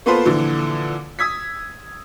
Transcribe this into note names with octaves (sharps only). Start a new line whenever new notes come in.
A#3 B3 F4 A4 B4 C5
A#2 D3 E3 F3
D#6 E6 G#6 B6